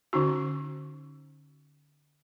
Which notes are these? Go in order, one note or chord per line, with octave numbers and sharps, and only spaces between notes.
D3 C#4 D#4 F#4